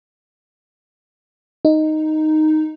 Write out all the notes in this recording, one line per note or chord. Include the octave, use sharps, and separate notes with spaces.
D#4